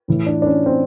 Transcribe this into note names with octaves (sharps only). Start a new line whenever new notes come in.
A2 E3
D4
D4
C#4
C4